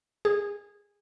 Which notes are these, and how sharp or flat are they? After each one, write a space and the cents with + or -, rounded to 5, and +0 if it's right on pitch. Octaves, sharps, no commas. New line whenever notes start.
G#4 -20